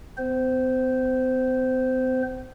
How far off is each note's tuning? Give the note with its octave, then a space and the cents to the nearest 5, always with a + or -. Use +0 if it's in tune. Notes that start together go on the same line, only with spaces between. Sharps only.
C4 -45 C5 -15